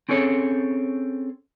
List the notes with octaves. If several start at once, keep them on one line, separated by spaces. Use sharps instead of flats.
C4 C#4 G#4 A4 C#5